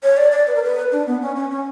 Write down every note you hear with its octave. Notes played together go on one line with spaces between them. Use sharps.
C#5
D5
D5
B4
A#4
B4
D4
B3
C#4
C#4
C#4